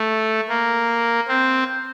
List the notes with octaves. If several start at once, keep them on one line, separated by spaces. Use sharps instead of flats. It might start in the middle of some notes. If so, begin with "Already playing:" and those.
Already playing: A3
A#3
C4